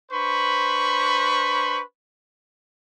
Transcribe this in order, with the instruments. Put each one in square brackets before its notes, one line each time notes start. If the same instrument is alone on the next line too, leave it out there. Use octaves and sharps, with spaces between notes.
[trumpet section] D4 B4 C5 B5 C#6